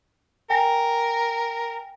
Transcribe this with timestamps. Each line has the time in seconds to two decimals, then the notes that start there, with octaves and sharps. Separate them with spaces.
0.50 A#4 G5 G#5 A#6